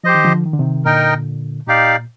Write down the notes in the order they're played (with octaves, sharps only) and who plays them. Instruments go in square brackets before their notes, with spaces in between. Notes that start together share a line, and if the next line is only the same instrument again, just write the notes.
[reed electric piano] F3 [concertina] G4 C5 D#5
[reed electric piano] D#3
D3 F3
D#3
D3
C3 D#3
[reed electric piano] A#2 D3 [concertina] D#4 A#4 D#5 G5
[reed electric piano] A#2 [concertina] D#4 G4 D5 F5